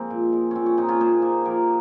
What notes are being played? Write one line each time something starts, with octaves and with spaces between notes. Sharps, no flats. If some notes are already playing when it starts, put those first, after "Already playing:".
Already playing: F3 G#3 A#3 C4
A#2
G#3
A#2 C4 C#4
C#4
A#2 C4 D#4
C#4 F4
A#2 G#4 C5
A#3
F3 G4 A#4